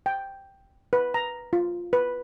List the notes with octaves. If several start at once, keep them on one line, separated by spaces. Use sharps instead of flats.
G5
B4
A#5
F4
B4